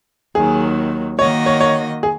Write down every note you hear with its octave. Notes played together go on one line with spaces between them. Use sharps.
D#2 D#3 F#3 G#4
D#3 A#3 F#4 C#5 D#5
C#5
C#5
G#4